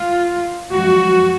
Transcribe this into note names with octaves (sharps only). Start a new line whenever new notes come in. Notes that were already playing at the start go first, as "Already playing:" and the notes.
Already playing: F4
F#2 F3 G#3 F#4